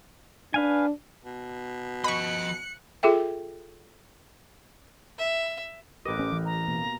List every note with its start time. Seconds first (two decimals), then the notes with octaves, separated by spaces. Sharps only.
0.54 D4 B4 F5 G#5
1.25 B2
2.04 F3 D#5 B5 C#6 F#6 C#7
3.03 F4 G#4 A4 E5 G5
5.19 E5
6.06 A1 G4 A#4 B4 D#5 D6
6.19 C#4
6.32 E3
6.45 A#5
6.68 B2 A#3